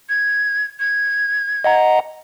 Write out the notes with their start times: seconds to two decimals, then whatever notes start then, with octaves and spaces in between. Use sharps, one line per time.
0.09 G#6
0.80 G#6
1.64 D#5 F#5 A#5